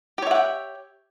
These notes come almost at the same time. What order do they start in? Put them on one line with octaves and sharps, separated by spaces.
G4 C#5 E5 F#5 G5